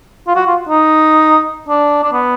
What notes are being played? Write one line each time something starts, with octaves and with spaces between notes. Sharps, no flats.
F4
F#4
F4
D#4
D4
D4
B3